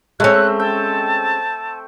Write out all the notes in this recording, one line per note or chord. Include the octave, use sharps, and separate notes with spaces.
G#3 A3 C4 C#4 F#6
G5 A5